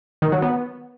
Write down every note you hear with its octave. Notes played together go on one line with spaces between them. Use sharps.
D#3
F#3
B3